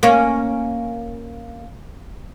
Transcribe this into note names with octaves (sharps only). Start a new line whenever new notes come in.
A#3 C#4